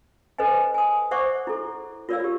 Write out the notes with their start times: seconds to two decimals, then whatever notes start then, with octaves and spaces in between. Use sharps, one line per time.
0.38 A4 B4 C5 D#5 G#5
0.74 G#5 D#6
1.11 C5 D5 E5 F#5 C#6 D6
1.47 E4 A4
2.09 F4 A#4 C#5 D5 F5 E6
2.20 F4 G4